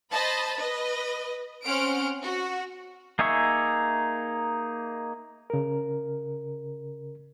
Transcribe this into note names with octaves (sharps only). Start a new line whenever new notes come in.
C5 D#5 A5 B5
B4 D#5
C4 C#4 F#5 C6 F6 D7
F#4
A#3 D#4 G#4 E5 C#6
C#3 A#4